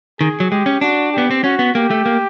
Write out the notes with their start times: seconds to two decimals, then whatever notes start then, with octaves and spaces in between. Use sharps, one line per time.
0.20 D#3 G#4
0.40 F#3
0.51 G#3 G4
0.66 C#4
0.81 D4 F#4
1.13 G4
1.18 B3
1.31 C4
1.43 C#4 F#4
1.59 B3
1.75 A#3 G4
1.91 A3
2.06 A#3